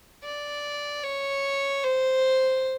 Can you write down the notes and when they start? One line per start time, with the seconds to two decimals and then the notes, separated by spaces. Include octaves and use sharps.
0.24 D5
1.04 C#5
1.84 C5